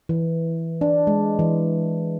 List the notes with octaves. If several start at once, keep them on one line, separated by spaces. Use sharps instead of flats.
E3
D4
G#3
E3